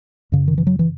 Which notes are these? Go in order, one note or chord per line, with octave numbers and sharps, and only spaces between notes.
F#2 C#3
D#3
E3
F#3
E3